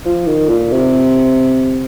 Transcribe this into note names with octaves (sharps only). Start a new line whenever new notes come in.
F3
D#3
A#2
C3